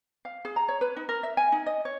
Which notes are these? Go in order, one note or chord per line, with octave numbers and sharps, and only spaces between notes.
F5
G#4
A#5
C#5
B4
D#4
A#4
E5
G#5
D#4
D#5
C#5